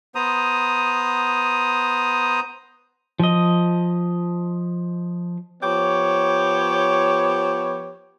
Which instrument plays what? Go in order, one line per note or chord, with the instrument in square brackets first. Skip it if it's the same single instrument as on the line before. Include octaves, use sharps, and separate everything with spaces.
[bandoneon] B3 C5 A#5 D#6
[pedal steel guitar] F3 D#5
[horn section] F3 B3 G4 C#5